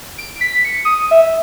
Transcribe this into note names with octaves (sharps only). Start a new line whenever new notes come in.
D7
B6
C#7
D#6
E5